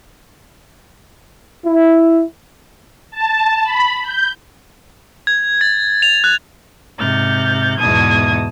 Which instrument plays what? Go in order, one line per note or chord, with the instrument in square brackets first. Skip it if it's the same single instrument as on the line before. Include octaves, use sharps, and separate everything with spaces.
[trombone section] E4
[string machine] A5
B5
G6
[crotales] G#6
A6
F7
F#6
[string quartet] G#2 C3 F6 G6 A6
E2 G#2 B2 A5 D#6 G#6